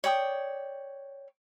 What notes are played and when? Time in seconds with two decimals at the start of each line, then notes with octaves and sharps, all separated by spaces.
0.04 C#5 D5 G5 D#6